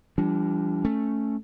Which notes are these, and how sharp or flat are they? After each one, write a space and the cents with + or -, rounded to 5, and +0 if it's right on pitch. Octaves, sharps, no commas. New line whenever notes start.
E3 +45 G3 +0 D4 -25
A3 +0 C#4 +0